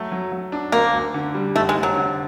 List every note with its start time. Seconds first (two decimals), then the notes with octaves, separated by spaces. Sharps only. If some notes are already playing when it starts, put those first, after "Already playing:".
Already playing: F#3 A3
0.12 F#3
0.32 F#3
0.52 D4
0.72 D2 A#3
0.93 D2
1.14 D3
1.34 G3
1.55 F1 A3
1.69 G#3
1.75 F1
1.83 F#3
1.96 D3